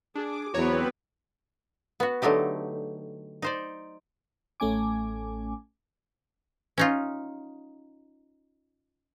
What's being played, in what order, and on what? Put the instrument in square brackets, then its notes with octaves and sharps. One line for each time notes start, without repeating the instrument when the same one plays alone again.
[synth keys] D4 [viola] G#4 [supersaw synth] D6
[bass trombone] E2 [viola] F#3 B3 [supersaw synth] C4 B4 [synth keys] F#4 C#5 A#5
[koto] B3 F#4
D3 F#3 A3 D#4 G4
D#4 C5 D5
[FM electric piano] A1 A3 C#4 G#5 D6
[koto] C#4 D#4 F4